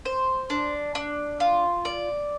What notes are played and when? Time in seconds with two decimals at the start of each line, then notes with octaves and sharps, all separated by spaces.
0.05 C5
0.50 D4
0.95 D4
1.40 F4
1.85 D5